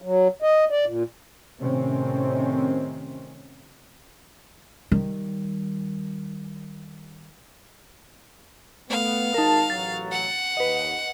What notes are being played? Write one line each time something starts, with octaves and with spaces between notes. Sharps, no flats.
F#3
D#5
D5
A#2
A2 C3 D#3 C4 C#4
D#3 G3
A3 B3 F5
G#1 D#4 A#4 A5
A1 F#3 A6
F#5
D#2 B4 D#5